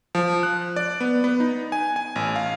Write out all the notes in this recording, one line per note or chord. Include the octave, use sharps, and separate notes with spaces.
F3
F#6
D5
B3
B3
D#4
G#5
G#5
A1
F5